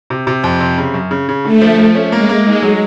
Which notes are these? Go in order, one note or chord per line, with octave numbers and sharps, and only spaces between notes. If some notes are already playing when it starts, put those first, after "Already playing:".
C3
C3
F2
C3
C#3
F#2
C#3
C#3
D3 A3
F3
F3
C#4
G#3 A#3
A#3
G#3 D#4
F#3